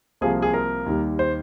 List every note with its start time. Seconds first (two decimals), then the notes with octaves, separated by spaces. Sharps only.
0.21 C2 C3 F3 A#3 F4 G#4
0.42 G#4
0.54 A#4
0.86 D#2 D#3 G3
1.19 C5